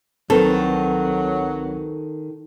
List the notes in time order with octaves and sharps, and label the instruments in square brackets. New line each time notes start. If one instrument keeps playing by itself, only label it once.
[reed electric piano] C2 C4 B4 [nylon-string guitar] D#3 [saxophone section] F#3 [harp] A4